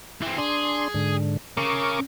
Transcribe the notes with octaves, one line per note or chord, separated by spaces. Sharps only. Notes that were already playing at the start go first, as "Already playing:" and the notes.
E3 C4
D4 G#4 C6
G#2 D3
C#3 A#4 C#6 D6